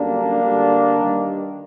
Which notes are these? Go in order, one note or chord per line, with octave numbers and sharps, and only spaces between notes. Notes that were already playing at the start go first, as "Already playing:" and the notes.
Already playing: F#2 D3 G3 A#3 D4
D2 D3 G3
G2 D#3 G3